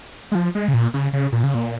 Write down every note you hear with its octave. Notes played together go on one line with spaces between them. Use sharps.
G#3
F3
G#3
C#3
A#2
C#3
C#3
A#2
C#3
A#2